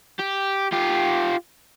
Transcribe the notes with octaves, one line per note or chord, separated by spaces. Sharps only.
G4
F4 G4